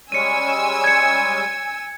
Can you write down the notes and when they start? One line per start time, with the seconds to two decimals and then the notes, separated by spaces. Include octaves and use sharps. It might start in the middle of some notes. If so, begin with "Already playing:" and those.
0.12 G3 G#3 C#4 G#5 E6 C#7 D#7
0.84 G#6 C#7